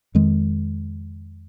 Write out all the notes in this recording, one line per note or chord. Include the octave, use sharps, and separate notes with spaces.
F2 D#3 G#3